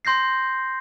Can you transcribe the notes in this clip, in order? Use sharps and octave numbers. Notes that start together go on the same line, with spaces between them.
C6 G6 A#6 C7